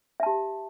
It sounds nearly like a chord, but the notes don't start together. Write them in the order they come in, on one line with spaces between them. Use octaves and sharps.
E5 A5 G4